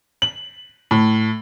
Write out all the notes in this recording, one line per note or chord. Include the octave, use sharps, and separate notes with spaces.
F#7
A2